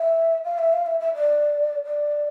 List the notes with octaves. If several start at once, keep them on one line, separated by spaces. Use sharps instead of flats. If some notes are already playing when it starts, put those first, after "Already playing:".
Already playing: E5
F5
E5
F5
E5
E5
D5
D5